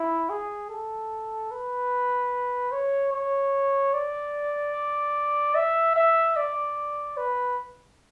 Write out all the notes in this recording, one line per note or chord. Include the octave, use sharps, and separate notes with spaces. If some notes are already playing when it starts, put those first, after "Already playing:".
Already playing: E4
G#4
A4
B4
C#5
C#5
D5
E5
E5
D5
B4